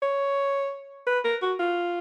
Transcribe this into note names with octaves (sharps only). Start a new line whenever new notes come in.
C#5
B4
A#4
F#4
F4